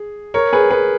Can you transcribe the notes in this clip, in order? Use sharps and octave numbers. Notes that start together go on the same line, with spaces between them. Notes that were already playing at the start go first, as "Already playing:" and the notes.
Already playing: G#4
A#4 C#5
G#4 B4
G#4 B4